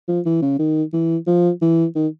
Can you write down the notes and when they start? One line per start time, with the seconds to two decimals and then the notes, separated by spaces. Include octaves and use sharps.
0.08 F3
0.26 E3
0.42 C#3
0.59 D#3
0.93 E3
1.27 F3
1.62 E3
1.95 D#3